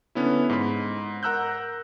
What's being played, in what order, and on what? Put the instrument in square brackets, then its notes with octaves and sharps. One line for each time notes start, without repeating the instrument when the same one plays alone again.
[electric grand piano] D3 B3 C#4 E4
G#2 B5
A#4 F#5 A#5 E6 F#6 G6